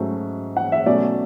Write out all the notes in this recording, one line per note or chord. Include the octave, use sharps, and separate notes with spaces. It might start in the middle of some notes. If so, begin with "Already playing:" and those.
Already playing: G#2 F#3 A3 C#4
F#5
E5
B2 F#3 A3 C#4 D5